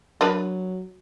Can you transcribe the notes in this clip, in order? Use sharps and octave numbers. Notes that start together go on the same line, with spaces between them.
F#3 D4 A#4 B4